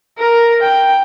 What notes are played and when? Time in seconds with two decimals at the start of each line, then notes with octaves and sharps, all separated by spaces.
0.18 A#4
0.62 G5